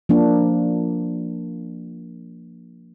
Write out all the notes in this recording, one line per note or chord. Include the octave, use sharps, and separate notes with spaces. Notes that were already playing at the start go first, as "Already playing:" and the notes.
F3 A#3 D4